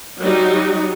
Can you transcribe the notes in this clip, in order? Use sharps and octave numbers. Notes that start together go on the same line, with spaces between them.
F#3 G3 D#4